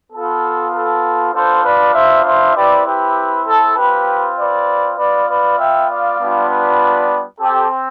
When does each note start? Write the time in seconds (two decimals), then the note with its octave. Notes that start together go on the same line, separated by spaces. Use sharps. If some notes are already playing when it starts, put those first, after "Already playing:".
0.12 B3 F4 A4
0.73 A4
1.34 B3 D4 F4 A4 C5
1.64 B4 D5
1.94 C5 E5
2.25 C5 E5
2.55 C4 E4 G4 B4 D5
2.85 G4 B4
3.46 A4
3.76 C4 F4 G4 B4
4.37 B4 D5
4.97 B3 F4 B4 D5
5.28 B4 D5
5.58 E5 G5
5.88 D5 F5
6.19 G3 B3 D4 F4
6.49 B4 D5
7.40 C4 G4 A4